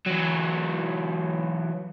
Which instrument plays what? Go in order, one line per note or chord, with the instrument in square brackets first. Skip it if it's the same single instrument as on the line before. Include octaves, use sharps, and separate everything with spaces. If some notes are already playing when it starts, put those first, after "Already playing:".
[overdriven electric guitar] E3 F#3